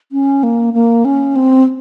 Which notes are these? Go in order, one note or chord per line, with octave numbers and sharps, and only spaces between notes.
C#4
A#3
A#3
C#4
C4